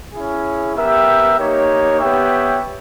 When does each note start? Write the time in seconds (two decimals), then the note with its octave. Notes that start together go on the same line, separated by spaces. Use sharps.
0.13 C#4 E4 G#4
0.75 B3 G4 A#4 E5 G5
1.38 A#3 D#4 G4 C#5
1.99 B3 G4 C#5 E5 G5